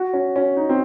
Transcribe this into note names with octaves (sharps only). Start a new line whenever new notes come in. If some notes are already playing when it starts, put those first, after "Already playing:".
Already playing: F#4
C#4
C#4
D#4
C4